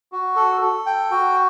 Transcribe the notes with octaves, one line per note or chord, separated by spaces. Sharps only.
F#4
A4
A4
G5
F#4